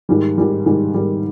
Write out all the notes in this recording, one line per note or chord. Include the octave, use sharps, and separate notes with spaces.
G#2 D#3 G3
G#2 D#3 G3
G#2 D#3 G3
G#2 D#3 G3